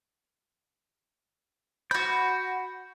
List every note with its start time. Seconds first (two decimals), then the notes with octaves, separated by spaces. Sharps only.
1.91 F#4 B5 G6